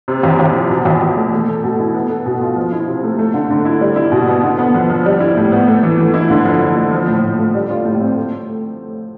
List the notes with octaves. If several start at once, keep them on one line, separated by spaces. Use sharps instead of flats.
C3
E2
E2
F3
B2
E2
E2
A3
A3
A4
B2
E4
B3
A4
B2
F4
F3
E4
C3
A3
A3
D3
D3
E4
G3
E4
B2
B3
D3
B3
F2
F3
G3
E4
A2
B3
A3
E3
E3
E4
D3
F2
F2
A3
F3
A2
A2
A3
G3
F4
A2
C4
A3